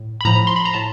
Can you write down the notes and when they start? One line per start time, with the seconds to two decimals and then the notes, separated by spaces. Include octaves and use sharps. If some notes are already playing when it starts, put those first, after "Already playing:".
Already playing: A2
0.21 B5
0.25 A2 F3 A#5
0.47 C6
0.56 B5
0.65 A#5
0.74 A2 A5